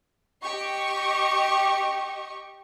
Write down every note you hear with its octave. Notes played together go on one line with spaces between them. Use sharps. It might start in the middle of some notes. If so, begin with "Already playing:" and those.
G4 D#5 C#6